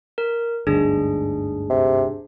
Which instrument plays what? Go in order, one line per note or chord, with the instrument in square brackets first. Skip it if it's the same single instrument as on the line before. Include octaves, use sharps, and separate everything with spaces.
[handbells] A#4
[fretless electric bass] G1 D2 G#2 [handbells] D4 G#4
[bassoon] C3